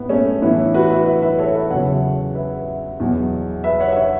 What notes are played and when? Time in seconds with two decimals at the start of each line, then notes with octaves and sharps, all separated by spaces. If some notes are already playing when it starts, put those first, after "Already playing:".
Already playing: A2 B3
0.09 A3 C#4
0.42 A2 E3 B3 E4
0.74 F#4 B4
0.90 B4 E5
1.06 B4 E5
1.22 B4 E5
1.32 B4
1.39 A4 C#5
1.55 B4 E5
1.70 E2 C#3 F#3 C#5 F#5
2.35 B4 E5
3.00 E2 B2 F#3
3.64 B4 E5
3.80 C#5 F#5
3.92 E5
3.96 C#5 F#5